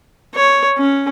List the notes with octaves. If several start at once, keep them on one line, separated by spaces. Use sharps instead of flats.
C#5
C#4